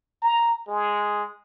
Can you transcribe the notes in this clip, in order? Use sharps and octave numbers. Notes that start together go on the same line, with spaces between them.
A#5
G#3